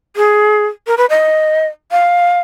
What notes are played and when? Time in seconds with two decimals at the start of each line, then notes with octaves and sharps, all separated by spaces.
0.16 G#4
0.87 A#4
0.98 B4
1.10 D#5
1.92 F5